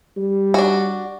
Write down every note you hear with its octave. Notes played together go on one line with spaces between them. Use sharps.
G3
D4 F#4